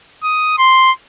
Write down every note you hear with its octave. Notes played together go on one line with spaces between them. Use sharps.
D#6
C6